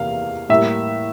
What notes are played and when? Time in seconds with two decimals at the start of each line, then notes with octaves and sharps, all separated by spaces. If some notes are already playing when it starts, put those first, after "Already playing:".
Already playing: E2 C3 A#3 F5
0.49 A2 G3 A#3 E5